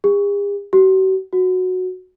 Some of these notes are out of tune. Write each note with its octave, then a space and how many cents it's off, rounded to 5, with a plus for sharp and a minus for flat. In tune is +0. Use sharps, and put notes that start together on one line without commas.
G#4 -45
F#4 +45
F#4 -10